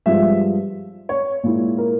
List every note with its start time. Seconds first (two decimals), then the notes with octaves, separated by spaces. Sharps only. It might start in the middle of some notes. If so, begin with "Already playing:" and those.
0.06 G2 F3 G#3 E5
1.09 C#5
1.44 A#2 G#3 E4
1.78 A#4